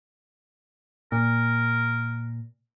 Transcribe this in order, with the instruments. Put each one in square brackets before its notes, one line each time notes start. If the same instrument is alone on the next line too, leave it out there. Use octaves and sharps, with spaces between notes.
[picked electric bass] A#2 [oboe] A#4